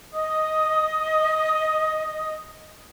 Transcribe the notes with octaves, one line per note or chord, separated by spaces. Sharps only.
D#5 D#6